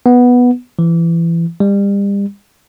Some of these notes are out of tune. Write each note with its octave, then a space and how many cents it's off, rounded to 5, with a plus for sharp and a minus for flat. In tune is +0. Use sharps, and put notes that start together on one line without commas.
B3 -5
E3 +25
G3 +35